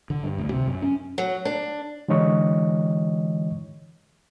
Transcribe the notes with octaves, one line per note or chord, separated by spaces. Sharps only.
D3
G2
D2
C3
F#2
C#4
F#3
D4
D3 E3 G#3 C#5 D#5 C#6